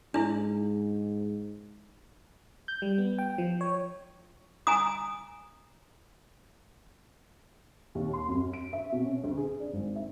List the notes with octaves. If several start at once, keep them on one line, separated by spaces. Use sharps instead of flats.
G#2 D4 E4
G6
G3
B3
G5
F3
C#5
G#5 A#5 D#6
D#2
C6
F#2
D7
E5
B2
C#4
D2
G#4
D4
G#1
E5